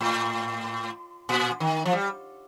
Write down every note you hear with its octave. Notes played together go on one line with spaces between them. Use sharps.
A2
A#2
D#3
F3
G3